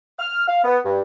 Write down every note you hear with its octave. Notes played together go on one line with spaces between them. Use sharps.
F6
F5
B3
G2